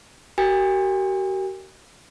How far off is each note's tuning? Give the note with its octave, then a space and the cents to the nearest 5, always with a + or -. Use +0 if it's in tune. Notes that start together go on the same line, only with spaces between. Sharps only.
G4 -45 A#4 -15 G#5 -45